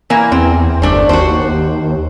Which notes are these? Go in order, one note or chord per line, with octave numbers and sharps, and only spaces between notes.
E3 A#3 A#4
E2 C4
G1 A3 D4 C5
D#2 F#4 C5